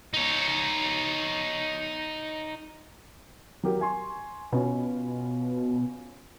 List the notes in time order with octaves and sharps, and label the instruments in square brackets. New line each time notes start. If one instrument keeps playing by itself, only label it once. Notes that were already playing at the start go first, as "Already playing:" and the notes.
[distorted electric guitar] D#4 C#5
[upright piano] F#3 G4 A#4
G#5 C6 C#6
[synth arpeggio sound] B2 [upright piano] B3 C#4 F4